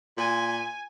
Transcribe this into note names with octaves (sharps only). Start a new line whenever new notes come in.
A#2 G#5